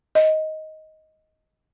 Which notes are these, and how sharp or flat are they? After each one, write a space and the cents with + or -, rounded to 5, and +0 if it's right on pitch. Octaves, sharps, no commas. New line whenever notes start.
D#5 +10